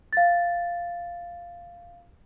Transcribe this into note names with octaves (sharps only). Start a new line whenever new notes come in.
F5 A6